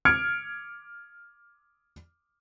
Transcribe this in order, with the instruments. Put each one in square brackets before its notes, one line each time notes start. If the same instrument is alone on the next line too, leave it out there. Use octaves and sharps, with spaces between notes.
[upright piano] F6 G#6 C#7 D7